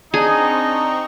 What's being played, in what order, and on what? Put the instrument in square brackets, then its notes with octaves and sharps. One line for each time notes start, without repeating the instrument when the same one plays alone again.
[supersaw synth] C4 A#5 C#6 [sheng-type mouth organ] D4 [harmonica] D#4 [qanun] G#4